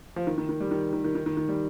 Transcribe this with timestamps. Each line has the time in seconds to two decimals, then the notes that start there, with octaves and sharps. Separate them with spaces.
0.16 F3
0.27 D#3
0.38 D#3
0.49 D#3
0.60 G3
0.71 D#3
0.93 D#3
1.04 D#3
1.15 D#3
1.26 D#3
1.37 D#3
1.48 G3